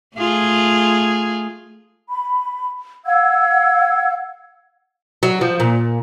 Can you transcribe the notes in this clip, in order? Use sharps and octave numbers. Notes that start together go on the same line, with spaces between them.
A3 F4 G#4
B5
F5 F#5 E6 G#6
F#3
F3
A#2